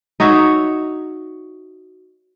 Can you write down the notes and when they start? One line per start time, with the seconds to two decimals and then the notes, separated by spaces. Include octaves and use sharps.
0.20 D#4 F#4 C#5 E5